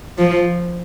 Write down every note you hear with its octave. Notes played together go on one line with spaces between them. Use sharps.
F3